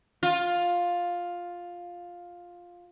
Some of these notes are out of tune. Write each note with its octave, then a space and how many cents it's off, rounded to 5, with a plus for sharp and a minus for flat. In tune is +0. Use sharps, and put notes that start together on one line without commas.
F4 +10